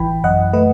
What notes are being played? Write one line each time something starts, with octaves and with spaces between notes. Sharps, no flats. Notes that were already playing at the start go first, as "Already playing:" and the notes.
Already playing: A1 E3 G5 B5
F#2 D#5 F#5
A3 B4 D#5